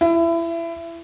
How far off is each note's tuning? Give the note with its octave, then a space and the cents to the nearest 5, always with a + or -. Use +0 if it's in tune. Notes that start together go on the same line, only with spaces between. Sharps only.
E4 +25